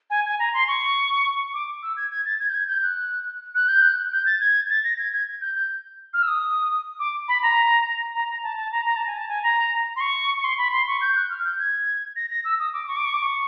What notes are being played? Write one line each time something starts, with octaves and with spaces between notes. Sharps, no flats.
G#5
G#5
A#5
C6
C#6
D6
E6
G#6
G#6
A6
G#6
G6
G#6
G6
F#6
F#6
G6
F#6
G6
A6
G#6
A6
A#6
G#6
G#6
G6
G6
F6
E6
D#6
D6
B5
A#5
A#5
A#5
A5
A5
A#5
A#5
A5
G#5
A5
G#5
A#5
C6
C#6
C#6
C6
B5
C6
C#6
G6
F#6
F6
G6
G#6
A#6
A#6
E6
D#6
D6
C#6
D6
C#6
D6
C#6